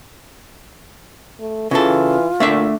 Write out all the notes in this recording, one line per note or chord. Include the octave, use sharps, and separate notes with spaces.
A3
C#3 E3 F4 A4
A#2 A3 D4 E5